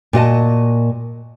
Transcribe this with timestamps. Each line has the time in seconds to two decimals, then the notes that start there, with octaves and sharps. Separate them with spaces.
0.13 A#2 F#4 D#5 A5